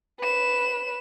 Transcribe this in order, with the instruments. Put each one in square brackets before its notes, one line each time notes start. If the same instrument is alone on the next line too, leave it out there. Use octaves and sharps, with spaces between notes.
[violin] B4 E7